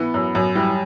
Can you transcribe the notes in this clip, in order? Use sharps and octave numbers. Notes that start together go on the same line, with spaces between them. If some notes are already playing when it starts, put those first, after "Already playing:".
Already playing: E3 B3
F#2
F#2
E3 G3